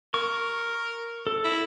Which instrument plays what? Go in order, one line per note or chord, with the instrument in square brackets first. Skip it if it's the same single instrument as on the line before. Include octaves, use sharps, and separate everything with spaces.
[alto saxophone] A#4 [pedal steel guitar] C#6
[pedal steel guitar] A4
[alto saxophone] E4